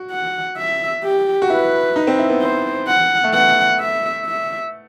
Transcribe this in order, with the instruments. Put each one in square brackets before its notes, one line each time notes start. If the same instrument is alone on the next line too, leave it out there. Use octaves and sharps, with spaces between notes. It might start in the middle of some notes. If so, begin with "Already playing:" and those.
Already playing: [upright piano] F#4
[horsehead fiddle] F#5
E5
G4
[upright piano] F#4
[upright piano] E4 [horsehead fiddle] B4
[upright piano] D#4
C4
E4
B3
[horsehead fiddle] C5
F#5
[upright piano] A3
[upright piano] B3 [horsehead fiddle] F#5
[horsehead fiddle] E5
E5